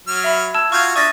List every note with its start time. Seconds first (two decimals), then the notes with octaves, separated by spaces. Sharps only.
0.07 F#3 F6
0.24 E5 B5
0.54 A5 E6 G#6
0.72 F4 F#4 C#6 F6 G6 G#6
0.96 D4 E5 C#6 D#6 A6 A#6